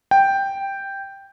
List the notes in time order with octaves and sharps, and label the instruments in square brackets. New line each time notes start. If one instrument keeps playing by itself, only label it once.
[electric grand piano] G5